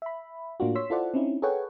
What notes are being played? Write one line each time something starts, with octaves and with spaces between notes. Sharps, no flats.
E5 B5
A2 A#3 D4 F4 F#4
C#5 C6 E6 B6
E4 F4 A4 C5 D5 F#5
C4 C#4 D#4 E4
G#4 A4 B4 C#5 F#5 G5